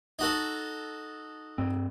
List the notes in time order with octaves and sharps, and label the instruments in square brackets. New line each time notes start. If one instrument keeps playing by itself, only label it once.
[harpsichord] D#4 F#4 A4
[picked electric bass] G2 C4